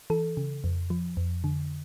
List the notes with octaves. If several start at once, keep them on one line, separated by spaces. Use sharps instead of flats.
E3 A4
C#3
F2
F3
F2
D3